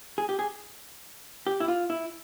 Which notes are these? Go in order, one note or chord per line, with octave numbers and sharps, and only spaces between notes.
G#4
G4
G#4
G4
E4
F4
E4